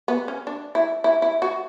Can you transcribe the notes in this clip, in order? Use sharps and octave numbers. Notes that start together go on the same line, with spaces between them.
B3
C#4
D4
E4
E4
E4
F#4